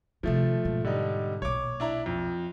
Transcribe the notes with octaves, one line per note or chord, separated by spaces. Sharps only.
C3 D#3 F3 A3
G#2 B2
D3 G3 D#4
B1 A#2 C#5 D6
D4 E4 A#5
F2